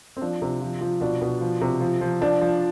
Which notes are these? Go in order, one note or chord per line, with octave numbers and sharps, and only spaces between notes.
C4
F3 D4
C3
F3
F3
B2 D4
B2
F3
C3
F3
F3
F3 D4
F3